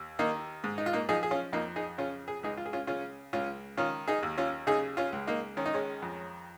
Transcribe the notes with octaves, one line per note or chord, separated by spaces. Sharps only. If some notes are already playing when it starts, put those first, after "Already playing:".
Already playing: D#2
D#3 A#3 D#4
G#2
D#4
F4
A#3 D#4
F3 D#4 G#4
G#4
C#4 F4
F2 A#3 D#4
D#4 G#4
C#3 C#4 F4
G#4
C#2 D#4 G#4
F4
G#4
C#4 F4
C#3 C#4 F4
C#2 C#4 F4
D#3 C#4 F4
D#4 G#4
D#2
C#4 F4
C#3 D#4 G#4
C#4 F4
C#2
A#3 D#4
D#3 C#4
D#4
G#3 C#4
F2